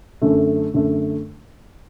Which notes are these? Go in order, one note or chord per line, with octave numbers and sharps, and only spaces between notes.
F#2 D3 A3
F#2 D3 A3